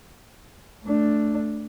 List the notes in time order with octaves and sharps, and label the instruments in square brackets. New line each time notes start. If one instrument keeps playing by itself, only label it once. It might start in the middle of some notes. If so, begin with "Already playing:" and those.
[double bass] A3 D4